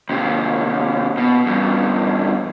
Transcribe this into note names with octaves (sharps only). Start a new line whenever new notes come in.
D#2 C3
B2
E2 G2